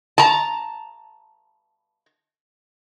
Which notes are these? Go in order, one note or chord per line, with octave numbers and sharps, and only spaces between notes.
A5 A#5